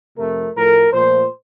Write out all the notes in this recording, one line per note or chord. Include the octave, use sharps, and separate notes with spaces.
F2 C3 F3 A3 A#4
A2 F3 A3 A#4
A#2 F3 A3 C5